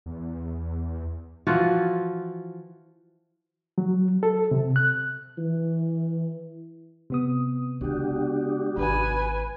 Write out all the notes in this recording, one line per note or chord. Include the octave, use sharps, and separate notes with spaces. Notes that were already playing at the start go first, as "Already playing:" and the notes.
E2
E3 F3 F4 F#4
F#3
A4
C3
F#6
E3
C3 B3 D#6
C#3 G#3 D4 F#4 G4
G#1 B4 G#5